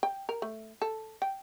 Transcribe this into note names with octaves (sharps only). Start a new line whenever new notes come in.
G5
A#4
A3
A4
G5